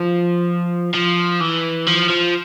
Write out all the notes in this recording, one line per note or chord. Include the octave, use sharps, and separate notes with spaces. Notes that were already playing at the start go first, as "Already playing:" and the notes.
Already playing: F3
F3
E3
F3
F3